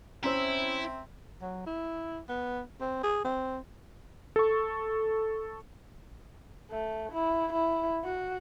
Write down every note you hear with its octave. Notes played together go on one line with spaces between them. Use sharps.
C4 C#4 E4 C5 E5 A#5 C6 E6
F#3
E4
B3
C4
G#4
C4
A4 C#6
A3
E4
E4
F#4